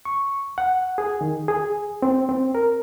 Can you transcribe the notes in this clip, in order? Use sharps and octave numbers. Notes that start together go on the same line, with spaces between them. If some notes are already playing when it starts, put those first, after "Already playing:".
C#6
F#5
G#4
D#3
G#4
C4
C4
A#4